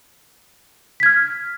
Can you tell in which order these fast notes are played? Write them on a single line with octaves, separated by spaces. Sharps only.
B6 G#6 F6